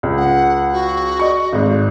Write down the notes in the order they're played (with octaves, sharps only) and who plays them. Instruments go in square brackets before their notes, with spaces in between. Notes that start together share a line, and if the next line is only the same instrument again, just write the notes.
[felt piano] C#2
[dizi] F#5
F#4
[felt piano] D5 D#5 C#6
G#1 G#2